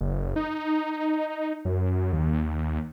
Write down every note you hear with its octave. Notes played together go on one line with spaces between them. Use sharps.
F#1
D#4
F#2
D#2